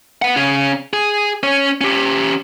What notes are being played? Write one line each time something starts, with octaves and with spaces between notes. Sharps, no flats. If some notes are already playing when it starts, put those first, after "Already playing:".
B4 F#5
C#3 C#4
G#4
C#4 C#5
C#4 G4